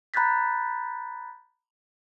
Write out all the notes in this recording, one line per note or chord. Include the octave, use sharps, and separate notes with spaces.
A#5 B5 F#6 G6 A6 B6